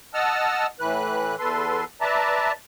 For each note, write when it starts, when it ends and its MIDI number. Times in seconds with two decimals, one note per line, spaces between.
0.14 0.67 75
0.14 0.67 78
0.14 0.67 81
0.14 0.67 88
0.14 0.67 89
0.80 1.36 45
0.80 1.36 52
0.80 1.36 71
0.80 1.36 90
1.39 1.84 40
1.39 1.84 69
1.39 1.84 71
1.39 1.84 84
2.01 2.52 71
2.01 2.52 74
2.01 2.52 76
2.01 2.52 81
2.01 2.52 82